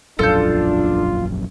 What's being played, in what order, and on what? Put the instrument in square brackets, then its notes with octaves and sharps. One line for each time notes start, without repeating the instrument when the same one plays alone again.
[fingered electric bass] E1 A#1 F#2 [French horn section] D4 [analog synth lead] F4 [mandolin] A4 G6